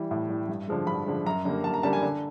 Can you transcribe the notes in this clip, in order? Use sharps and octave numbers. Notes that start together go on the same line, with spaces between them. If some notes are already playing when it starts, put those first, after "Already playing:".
Already playing: E3 G3
A2
E3 G3
G2
D3 F3 G#3
G2 B5
D3 F3 G#3
F#2 A#5
D3 G3 A#3
F#2 A5
A#5
D3 G3 A#3 A5
G#5
D3